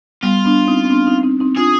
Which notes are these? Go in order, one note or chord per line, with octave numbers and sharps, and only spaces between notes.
G3 B3 F4
B3 D4
C4 D#4
C4
B3 D4
C4 D#4
C4 D#4
C4 D#4
D4 F4 G#4